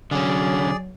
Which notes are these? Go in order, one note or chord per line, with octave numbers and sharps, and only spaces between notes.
D3 F#3 C#4 G#4 D5